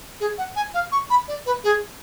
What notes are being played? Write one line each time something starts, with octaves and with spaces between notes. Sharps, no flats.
G#4
F#5
G#5
F5
C#6
B5
D5
B4
G#4